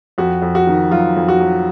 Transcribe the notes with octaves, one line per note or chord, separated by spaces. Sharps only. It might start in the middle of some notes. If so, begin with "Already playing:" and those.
F2 F#4
F2
F#4
D#3
F#3 F4
F2
F#4
F#3